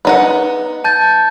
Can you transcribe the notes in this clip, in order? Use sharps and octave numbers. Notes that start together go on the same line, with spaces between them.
B3 D#4 F#5
A5 G6 A6